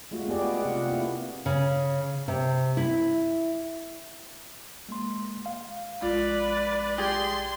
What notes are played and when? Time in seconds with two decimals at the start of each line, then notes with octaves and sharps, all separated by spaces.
0.11 G#3 A3 F4 F#4
0.28 B3 G4 G#4 D5
0.61 C3 F4 F#5
0.87 A#3 E4
1.46 C#3
2.28 C3
2.77 E4
4.89 G#3 A#3 C6
5.46 F5
6.02 A#1 G#3 F4 B4 D5
6.98 G4 G#4 C6